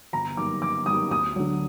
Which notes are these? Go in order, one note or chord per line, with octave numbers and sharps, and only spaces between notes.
G1 A#5
F#2 D#3 G3 A#3 D6
G1 D6
F#2 D#3 G3 A#3 D#6
D2 D#6
D3 F#3